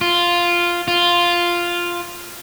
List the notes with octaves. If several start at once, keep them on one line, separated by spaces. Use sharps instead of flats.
F4
F4